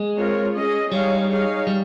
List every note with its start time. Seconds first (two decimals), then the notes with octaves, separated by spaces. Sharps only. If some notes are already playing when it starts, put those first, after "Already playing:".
Already playing: G#3
0.16 C4 F4 A#4 C#5
0.54 C#4 G#4 D#5
0.91 G3 G#3 D#4 G#4 C#5 F5
1.29 D#4 G#4 C#5 F5
1.67 G3